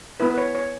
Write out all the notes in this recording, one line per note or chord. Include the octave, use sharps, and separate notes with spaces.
B3 E4 B4
B4
C#5
C#5